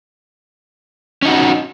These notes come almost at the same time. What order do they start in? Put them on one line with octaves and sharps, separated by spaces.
C#4 D#4 F#4